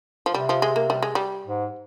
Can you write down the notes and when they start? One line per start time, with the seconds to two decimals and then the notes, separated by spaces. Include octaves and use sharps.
0.26 F3
0.34 C3 G3
0.49 F3
0.62 G#3
0.76 A#3
0.90 G3
1.03 G#3
1.15 G3
1.46 G#2